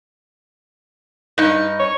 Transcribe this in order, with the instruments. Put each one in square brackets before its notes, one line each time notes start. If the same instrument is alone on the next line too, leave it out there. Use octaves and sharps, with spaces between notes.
[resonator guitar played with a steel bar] G2 D#4
[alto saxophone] C#5